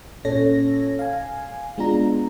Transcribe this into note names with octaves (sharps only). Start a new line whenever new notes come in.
A#2 C#4 A4 C#5 A#6
F5 G#5
G#3 B3 D4 F4 A#5